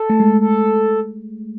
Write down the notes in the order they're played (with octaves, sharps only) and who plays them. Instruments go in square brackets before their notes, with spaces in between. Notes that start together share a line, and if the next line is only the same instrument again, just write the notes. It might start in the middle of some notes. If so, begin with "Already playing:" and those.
Already playing: [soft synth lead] A4
[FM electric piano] A3
G#3
[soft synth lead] A4